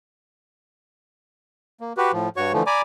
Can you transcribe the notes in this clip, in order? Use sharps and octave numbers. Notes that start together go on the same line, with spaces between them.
A#3
F#4 G4 B4
A2 F3
G2 F#4 C#5 C#6
D3 E3 F3 A3
D5 G#5 A#5 B5 D6